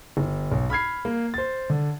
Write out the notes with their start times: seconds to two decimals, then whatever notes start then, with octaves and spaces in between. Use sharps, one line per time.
0.17 G1
0.52 B1
0.70 B5 F6 G#6 C7
1.05 A#3
1.34 C5 A6
1.70 D3